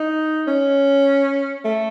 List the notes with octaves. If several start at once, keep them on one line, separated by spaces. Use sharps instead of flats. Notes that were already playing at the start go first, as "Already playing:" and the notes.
Already playing: D#4
C#4
A3